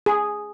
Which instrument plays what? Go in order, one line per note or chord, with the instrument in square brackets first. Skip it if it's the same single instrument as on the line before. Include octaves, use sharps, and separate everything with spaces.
[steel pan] G#4